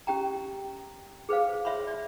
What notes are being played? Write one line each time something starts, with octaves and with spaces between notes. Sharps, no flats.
C#4 G4 G5 A#5
G#4 B4 C5 F5
C#5 E5 B5 C6
D5